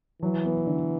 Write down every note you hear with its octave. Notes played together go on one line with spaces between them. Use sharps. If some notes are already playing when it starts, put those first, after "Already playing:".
E3 F#3
B3
D3